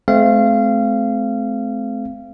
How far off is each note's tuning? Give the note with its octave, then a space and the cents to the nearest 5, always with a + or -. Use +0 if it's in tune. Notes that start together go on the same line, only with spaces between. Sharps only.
A3 -40 C4 -20 F5 -25